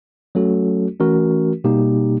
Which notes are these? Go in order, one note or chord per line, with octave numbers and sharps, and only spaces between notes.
F#3 A3 C#4 F#4 A4
E3 A3 C#4 F#4 A#4
B2 G3 A#3 D#4 G4